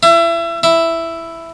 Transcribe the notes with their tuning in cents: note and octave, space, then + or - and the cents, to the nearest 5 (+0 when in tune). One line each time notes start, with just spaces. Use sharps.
E4 +30
E4 +5